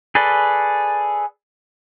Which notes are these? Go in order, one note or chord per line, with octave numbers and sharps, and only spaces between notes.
G#4 A4 B4 D5